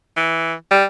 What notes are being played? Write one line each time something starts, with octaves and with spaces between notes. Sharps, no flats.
E3
G3